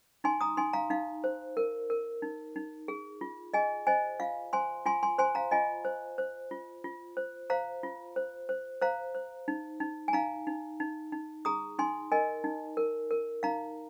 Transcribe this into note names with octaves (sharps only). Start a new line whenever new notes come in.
D#4 G#5 C6
A#5 D#6
D#4 G#5 C6
F5 A#5
D#4 F5
C5
A#4
A#4
D#4
D#4
G#4
F4
G#4 D#5 G#5
C5 D#5 G#5
F4 F5
C5 G#5 C6
F4 G#5 C6
G#5 C6
C5 G#5 C6
F5 A#5
F4 D#5 G#5
C5
C5
F4
F4
C5
C5 F5 A#5
F4
C5
C5
C5 F5 A#5
C5
D#4
D#4
G#5
D#4 F5 A#5
D#4
D#4
D#4
G#4 A#5 D#6
D#4 G#5 C6
A#4 D#5 G#5
D#4
A#4
A#4
D#4 F5 A#5